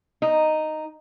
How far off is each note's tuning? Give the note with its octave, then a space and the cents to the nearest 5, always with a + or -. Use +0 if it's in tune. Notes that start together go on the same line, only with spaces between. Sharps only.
D#4 -5